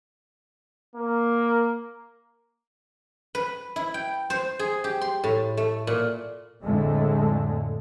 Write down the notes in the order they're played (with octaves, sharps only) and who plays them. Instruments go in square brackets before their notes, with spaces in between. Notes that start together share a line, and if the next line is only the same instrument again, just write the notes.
[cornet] A#3
[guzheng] B4
E4
G5
C5
G#4
G4
C6
A2
A3
A#2
[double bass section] F2 A2 D3 G#3 A3